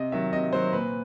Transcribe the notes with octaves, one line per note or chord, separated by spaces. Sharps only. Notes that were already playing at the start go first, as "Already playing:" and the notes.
Already playing: C3 D#5
D#3 F#3 E5
C3 D#5
D#3 F#3 C5
A#2 B4